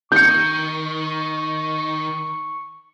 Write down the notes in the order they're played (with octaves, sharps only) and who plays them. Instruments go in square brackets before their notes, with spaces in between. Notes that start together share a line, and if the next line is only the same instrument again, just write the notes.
[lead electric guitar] D#3 [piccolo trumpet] C#6 [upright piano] G6 C#7